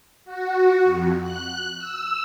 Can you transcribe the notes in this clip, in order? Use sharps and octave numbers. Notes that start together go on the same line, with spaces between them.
F#4
F2
F#6
E6